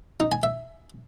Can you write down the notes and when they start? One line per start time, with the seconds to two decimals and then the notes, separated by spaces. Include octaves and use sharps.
0.20 D#4
0.32 G#5
0.43 E5